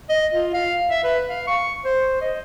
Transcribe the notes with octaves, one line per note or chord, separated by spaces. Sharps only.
D#5
F4
F5
E5
B4
F5
C#6
C5
D#5